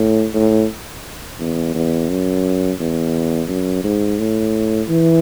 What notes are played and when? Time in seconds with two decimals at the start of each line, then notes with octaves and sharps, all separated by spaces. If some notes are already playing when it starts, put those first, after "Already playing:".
Already playing: A2
0.34 A2
1.40 E2
1.75 E2
2.09 F#2
2.80 E2
3.49 F#2
3.84 G#2
4.19 A2
4.89 E3